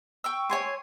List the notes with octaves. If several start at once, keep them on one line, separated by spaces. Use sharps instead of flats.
G5 C#6 E6
C#5 G#5 C6